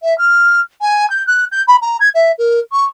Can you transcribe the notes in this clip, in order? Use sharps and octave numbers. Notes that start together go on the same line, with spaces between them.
E5
F6
G#5
G6
F#6
G6
B5
A#5
G#6
E5
A#4
C#6